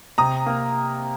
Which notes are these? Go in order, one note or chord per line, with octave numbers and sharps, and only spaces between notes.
C3 A#5 D#6
A#3